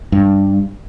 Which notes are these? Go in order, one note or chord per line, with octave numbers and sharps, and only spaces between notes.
G2